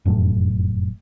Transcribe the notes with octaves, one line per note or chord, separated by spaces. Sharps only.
F1 F#2 A2